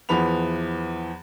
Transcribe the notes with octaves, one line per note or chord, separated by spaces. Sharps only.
E2 E3 F3 B3 B5 F7